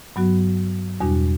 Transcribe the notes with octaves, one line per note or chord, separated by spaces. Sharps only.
G2 F#3 B3 F#4
E2 B2 G3 D4 F#4